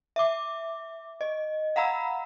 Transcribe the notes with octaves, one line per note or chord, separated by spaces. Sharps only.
E5 D6
D#5
F5 F#5 A#5 B5 E6